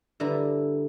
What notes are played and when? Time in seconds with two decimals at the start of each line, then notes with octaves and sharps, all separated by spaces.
0.20 G2 D3 E4 A#5